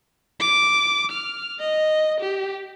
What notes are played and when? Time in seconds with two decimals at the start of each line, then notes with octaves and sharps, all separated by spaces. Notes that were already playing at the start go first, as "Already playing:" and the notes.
0.40 D6
1.11 F6
1.59 D#5
2.20 G4